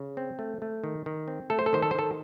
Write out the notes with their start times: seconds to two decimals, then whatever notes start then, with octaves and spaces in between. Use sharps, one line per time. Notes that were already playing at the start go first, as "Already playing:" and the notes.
Already playing: C#3
0.17 C4
0.39 A3
0.62 A3
0.84 D#3
1.06 D#3
1.28 C4
1.50 A3 A4
1.59 C5
1.66 A4
1.73 D#3 C5
1.82 A4
1.91 C5
1.95 D#3 A4